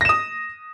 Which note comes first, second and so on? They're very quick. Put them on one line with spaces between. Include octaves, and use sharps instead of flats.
A#6 E7 D#6